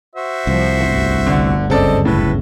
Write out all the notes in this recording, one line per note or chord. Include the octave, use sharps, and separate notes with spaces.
F#4 C5 E5
C2 F3
G1 D2
D3
F#1 C#3 C4 A4 D5 D#5
A2 A4 B4